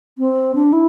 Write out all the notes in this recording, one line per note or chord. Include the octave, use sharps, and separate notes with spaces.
C4
D4
E4